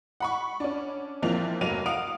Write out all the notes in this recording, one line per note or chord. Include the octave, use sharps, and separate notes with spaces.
F#5 B5 C#6
C#4 D4
A#1 E3 F3 A#3 C4 F7
F1 F#3 A#3 D#7 F7
F5 F#5 D#6 D7 F7